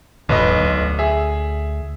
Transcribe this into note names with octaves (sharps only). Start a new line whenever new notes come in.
D#1 B1 G#2 D3 B4 D#5
D2
G#4 E5